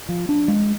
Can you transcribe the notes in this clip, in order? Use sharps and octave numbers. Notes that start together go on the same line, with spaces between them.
F3
D4
G#3